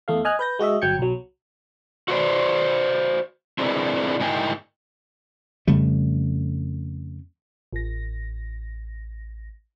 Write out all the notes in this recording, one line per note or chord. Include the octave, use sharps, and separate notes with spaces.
E2 A3 F5
D#5 G#5 F6 F#6
B4 G6 A#6
G#3 F#4 D#5 E5
G1 F#3 G5 G6 G#6 C#7
B1 F#3
F#4 B4 C5 D5
C4 D4 E4 G#4 A#4 B4
G#2 D#4 E4 A#4 G5 G#5
F2 C#3 G3 A3
A1 A#6